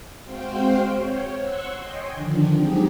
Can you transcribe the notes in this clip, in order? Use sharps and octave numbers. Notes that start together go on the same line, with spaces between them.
G#3 C4 F#4 C5 F5 G5
C#5
F#5 C6 C#6 E6
C#5 D#5 G5 G#5 C6
D3 D#3 F3 D4
F#3 G#3 C4 D#4 G4 G#4